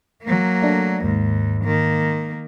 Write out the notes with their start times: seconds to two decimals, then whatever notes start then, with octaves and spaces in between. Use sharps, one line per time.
0.23 F#3 A#3
0.62 A3 D4
1.04 D#2 G#2
1.64 D#3 A#3